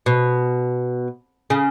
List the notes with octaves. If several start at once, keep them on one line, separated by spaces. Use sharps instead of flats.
B2
C#3